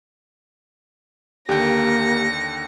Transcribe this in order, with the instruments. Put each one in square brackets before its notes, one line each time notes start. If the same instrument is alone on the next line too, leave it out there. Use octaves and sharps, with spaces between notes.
[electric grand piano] D#2 D3 G5 [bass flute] A#3 [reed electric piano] G4 [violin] A#6 C#7